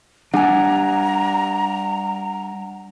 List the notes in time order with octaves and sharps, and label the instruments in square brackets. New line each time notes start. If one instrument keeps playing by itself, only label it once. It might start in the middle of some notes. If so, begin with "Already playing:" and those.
[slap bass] G3 D4 [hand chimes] F#5 G#5 [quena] A#5